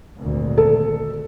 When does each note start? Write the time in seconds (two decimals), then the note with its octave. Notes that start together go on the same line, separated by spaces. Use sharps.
0.20 G#1 D2 A#2
0.58 A4